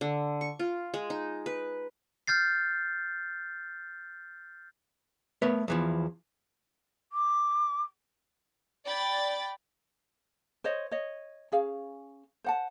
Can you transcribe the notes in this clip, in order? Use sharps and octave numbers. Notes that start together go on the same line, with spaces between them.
D3
C#6
F4
G#3
D#4
B4
F6 G6 A6 C7
A3 B3 A#4 B4 C#5
E2 E3 F3
D6
D5 G5 B5 A6
C5 C#5 D#5
C#5 D#5
C#4 G#4 F5
C5 F#5 A5